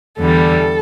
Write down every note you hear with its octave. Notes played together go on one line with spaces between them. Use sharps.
E2 D3 G3 A4